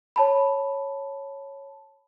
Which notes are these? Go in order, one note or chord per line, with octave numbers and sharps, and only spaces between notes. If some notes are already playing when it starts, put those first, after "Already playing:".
C#5 A5 B5